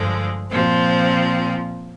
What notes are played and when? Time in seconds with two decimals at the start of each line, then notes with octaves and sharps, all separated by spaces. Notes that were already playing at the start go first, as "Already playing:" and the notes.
Already playing: G2 D3 F3 G#3
0.51 A#2 F3 C4